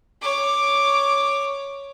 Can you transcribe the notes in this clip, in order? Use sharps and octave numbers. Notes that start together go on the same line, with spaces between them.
C#5 D6